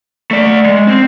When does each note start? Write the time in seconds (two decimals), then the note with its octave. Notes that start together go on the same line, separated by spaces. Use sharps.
0.31 A3 D5
0.66 G#3
0.87 C4